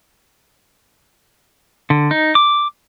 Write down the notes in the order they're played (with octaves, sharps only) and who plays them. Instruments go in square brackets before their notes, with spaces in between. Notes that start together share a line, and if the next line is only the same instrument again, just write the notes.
[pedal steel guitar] D3
D#4
D6